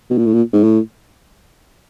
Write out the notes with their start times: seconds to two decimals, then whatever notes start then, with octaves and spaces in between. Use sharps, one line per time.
0.10 B2
0.18 A#2
0.26 A2
0.34 A#2
0.53 G#2
0.63 A2